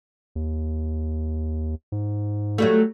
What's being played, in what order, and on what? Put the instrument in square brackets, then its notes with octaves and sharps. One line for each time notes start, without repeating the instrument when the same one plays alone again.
[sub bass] D#2
G#2
[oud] F#3 G3 A3